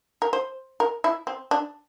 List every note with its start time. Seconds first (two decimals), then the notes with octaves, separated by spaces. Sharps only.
0.22 A#4
0.33 C5
0.80 A#4
1.04 E4
1.27 C4
1.51 D4